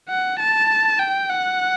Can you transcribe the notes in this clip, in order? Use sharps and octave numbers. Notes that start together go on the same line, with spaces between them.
F#5
A5
G5
F#5